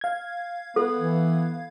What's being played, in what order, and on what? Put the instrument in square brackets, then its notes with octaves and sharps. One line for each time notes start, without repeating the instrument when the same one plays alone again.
[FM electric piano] F5 G#6
[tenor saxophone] B3 [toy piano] A4
[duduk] E3